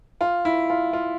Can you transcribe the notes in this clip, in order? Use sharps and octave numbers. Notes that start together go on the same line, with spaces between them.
F4
E4
F4
F4